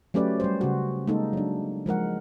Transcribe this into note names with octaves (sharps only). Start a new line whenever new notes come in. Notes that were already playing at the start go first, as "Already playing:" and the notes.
F#3 A3 C#4 G4 B4 D5
G3 C5
C#3 F#4
G#3 A#3 D#4 A4
F#3 D4
F3 G#3 A#4 F#5